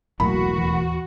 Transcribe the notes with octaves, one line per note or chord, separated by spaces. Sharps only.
E1 C2 A2 F#3 A#3 F#4 B5
D#2 E3